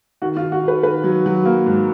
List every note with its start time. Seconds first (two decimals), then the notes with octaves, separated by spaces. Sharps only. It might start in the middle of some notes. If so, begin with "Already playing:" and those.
0.22 D#3 F#4
0.37 F4
0.42 D#3
0.52 F#4
0.63 D#3
0.68 B4
0.83 D#3 B4
1.04 F#3
1.26 F#3
1.45 A#3
1.66 G#2